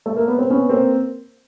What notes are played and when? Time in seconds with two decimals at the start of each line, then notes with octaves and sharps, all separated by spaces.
0.06 A3
0.16 A#3
0.28 B3
0.38 C4
0.50 B3 C#4
0.70 A#3 C4